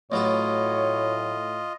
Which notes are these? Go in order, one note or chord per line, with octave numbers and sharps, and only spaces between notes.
A1 A2 F#3 F4 A4 C#5 D#5